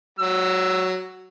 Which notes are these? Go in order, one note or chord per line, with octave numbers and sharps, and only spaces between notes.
F#3 E6